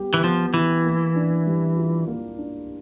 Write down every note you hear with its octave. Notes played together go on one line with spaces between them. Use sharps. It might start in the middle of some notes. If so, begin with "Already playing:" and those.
Already playing: G3 B3 G4
E3
F3 B3
E3 E4
A#3
D4
G3
F4
A#3
D4